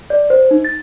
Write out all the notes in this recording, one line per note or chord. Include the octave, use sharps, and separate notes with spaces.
D5
C5
D#4
A6